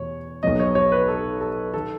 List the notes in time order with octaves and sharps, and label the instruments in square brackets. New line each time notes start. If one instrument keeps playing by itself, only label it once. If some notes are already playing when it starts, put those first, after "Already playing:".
Already playing: [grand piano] E2 B2 A3 C#5
B1 B2 F#3 D#5
C#5
C#5
B4
A4
A4
D#3 A4